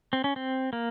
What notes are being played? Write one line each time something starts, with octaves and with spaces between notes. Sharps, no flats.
C4
C#4
C4
A#3